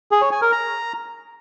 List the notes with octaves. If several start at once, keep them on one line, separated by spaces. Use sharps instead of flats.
G#4
C#5
G#5
A#4
A#5